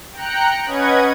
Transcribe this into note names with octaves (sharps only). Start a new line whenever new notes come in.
G5 A#5 F#6 C#7
C#4 B4 D#5 F#5 G#6